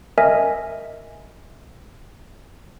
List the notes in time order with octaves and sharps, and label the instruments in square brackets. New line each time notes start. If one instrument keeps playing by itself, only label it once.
[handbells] A#4 D#5 E5 G#5